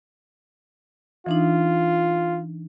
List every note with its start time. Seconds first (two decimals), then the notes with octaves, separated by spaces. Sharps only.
1.26 E3 D4 D#4 F4